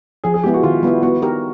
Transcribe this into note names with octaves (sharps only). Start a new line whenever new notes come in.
F3 G#4
G#4
G#3 B3 E4 G4
F#4
D#3 F4
G3 B3 E4
B3 F#4
D#4 G4 A#4